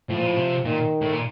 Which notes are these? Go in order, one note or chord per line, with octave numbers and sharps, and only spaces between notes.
A2 F3
A#2
A2
C3
A#2 D#3
A2
A#2